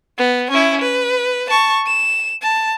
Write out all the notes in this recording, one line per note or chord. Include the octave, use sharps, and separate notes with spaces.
B3
C#4 E4
B4
A5 C#6
E7
A5